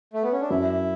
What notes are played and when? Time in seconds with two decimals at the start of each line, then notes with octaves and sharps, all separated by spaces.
0.13 A3
0.23 B3
0.32 C#4
0.41 D4
0.50 F#2 E4